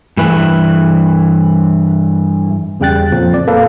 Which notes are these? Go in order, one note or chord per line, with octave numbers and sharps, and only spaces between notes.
G2 E3 B4
E2 C#3 G3 G5 F#6 A6
F2 A#2 F3
D5
A#3 A4 B4 F5